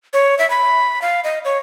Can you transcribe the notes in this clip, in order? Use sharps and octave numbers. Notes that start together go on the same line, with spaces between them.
C#5
E5
B5
F5
D#5
C#5